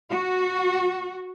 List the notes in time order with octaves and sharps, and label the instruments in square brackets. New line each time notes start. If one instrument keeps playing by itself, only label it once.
[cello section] F#4